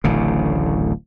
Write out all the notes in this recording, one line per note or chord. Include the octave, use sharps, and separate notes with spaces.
D1 A1 D2 C#3